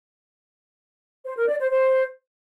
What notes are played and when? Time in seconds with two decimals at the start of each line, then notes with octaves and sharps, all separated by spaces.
1.25 C5
1.36 A#4
1.48 D5
1.59 C5
1.71 C5